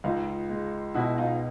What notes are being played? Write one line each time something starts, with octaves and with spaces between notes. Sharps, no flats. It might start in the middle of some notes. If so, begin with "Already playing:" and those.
C#2 D#4 F4
G#3
B2 E4 F#4
D#4 F4